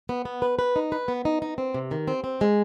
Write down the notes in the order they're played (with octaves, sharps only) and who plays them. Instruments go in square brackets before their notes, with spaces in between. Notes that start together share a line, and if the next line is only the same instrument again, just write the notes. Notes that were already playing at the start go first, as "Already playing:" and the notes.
[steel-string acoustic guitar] B3
B3
B4
B4
D#4
B4
B3
D#4
D#4
C4
C3
D#3
C4
C4
G#3